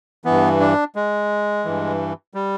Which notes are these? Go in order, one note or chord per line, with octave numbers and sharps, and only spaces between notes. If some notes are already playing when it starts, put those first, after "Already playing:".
G2 E3 B3
D4
G#3
G2 E3
G3